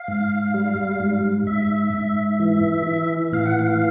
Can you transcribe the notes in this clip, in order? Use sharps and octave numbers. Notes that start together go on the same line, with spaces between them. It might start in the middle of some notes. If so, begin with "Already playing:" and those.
Already playing: F5
G#2
G3
G#2
G#2 E5
G#2
E3
E3
A2 F5
F#5
F5